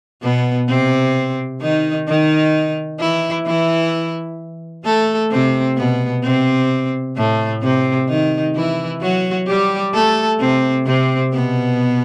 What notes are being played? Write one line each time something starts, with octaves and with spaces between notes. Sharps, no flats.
B2 B3
C3 C4
D#3 D#4
D#3 D#4
E3 E4
E3 E4
A3 A4
C3 C4
B2 B3
C3 C4
A2 A3
C3 C4
D#3 D#4
E3 E4
F#3 F#4
G3 G4
A3 A4
C3 C4
C3 C4
B2 B3